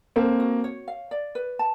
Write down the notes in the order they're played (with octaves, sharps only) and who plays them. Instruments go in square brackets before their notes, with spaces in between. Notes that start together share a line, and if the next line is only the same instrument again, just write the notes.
[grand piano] A#3 C4 [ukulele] A4
[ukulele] F#4
C#5
F5
D5
B4
A5